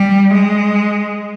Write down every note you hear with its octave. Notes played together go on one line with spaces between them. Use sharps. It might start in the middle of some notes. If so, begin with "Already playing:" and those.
Already playing: G3
G#3